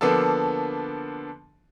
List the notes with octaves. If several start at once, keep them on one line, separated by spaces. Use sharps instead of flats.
D3 F3 A#3 B3 D4 A4